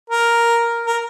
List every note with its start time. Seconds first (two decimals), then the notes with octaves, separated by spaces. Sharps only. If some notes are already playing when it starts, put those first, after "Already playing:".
0.10 A#4
0.86 A#4